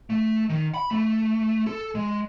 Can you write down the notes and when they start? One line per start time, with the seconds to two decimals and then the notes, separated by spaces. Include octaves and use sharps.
0.10 A3
0.49 D#3
0.74 B5
0.91 A3
1.67 A4
1.95 G#3